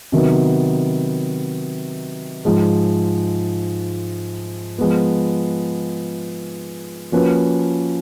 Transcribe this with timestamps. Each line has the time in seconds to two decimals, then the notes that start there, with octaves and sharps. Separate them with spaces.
0.12 C3 D#3 F#3 B3
2.45 G#2 F3 G#3
4.78 F3 G#3 B3
7.12 F3 A#3 C#4 F#4 B4